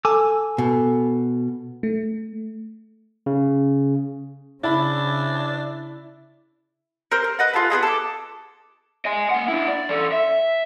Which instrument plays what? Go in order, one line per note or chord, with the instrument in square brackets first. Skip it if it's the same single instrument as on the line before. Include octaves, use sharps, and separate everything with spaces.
[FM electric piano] A4 [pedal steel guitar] G#5 D6 E6
[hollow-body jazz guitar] B2
[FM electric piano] A3
[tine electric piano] C#3
[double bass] C#3 [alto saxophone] D4 [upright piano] E4 B5
[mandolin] A#4 C5
A#4
B4 D#5 F#5
F4 G#4 A4 B4
B3 C4 G#4 D#5
A4 D6
[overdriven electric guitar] D#5 G#5
A#3 F#5
D4 E4
D5
E3 A4
E5